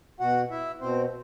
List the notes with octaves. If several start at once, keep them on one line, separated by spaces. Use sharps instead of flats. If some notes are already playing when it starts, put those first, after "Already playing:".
B2 F#4 F#5
E4 E5
B2 C4 C5